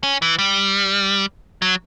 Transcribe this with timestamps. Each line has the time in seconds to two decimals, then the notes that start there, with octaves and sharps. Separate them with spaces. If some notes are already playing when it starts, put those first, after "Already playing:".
0.03 C#4
0.22 E3
0.39 G3
1.62 F#3